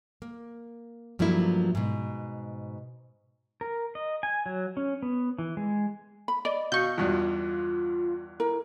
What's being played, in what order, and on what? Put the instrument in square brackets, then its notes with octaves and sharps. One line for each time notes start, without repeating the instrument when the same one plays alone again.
[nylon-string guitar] A#3
G2 F3 F#3 A3 A#3 E4
G#2 B2
[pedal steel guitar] A#4
D#5
G#5
F#3
C#4
B3
E3
G#3
[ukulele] B5
[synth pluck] D5 [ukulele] D#5
[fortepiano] B2 [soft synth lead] F5 [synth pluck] C#6 G6
[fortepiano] E2 G2 B2 [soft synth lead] F4
[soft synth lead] E4 [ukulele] A#4